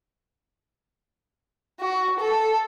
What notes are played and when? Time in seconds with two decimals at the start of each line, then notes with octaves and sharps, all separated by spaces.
1.80 F#4
2.20 A4